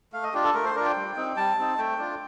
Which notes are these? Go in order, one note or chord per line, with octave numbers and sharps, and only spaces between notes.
A3 F5
D#5
D4 F4 G4
A4
A3 A#4
C5
D4 F4 A#4
G5
G3
C4 D#4
G3 A5
C4 D#4
A3 G5
D4 F4